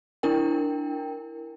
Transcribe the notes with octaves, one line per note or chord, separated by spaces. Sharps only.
D4 E4 A#4 G5